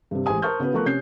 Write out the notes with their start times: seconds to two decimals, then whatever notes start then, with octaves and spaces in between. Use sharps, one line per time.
0.11 G2 C3
0.26 A1 G#3 G4 C5 G#5 D#6
0.42 A#4 C5 A5 C#6 F6 G6
0.60 C#3 B3 F#4 B4
0.73 F3 A3 B3 A#4 C#6 F#6
0.85 C3 C#4 G6 C7